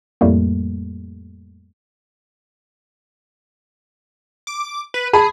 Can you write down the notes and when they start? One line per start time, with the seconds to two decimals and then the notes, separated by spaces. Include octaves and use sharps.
0.21 F2 A2 G3 A3 A#3
4.47 D6
4.94 B4
5.13 G#4 A5 B5